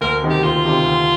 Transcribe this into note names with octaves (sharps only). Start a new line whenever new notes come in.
D2 A#4
C3 D#3
G4
D2 F4
C3 D#3
D2